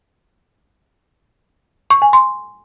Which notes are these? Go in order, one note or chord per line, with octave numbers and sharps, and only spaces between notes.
C#6
G#5
C6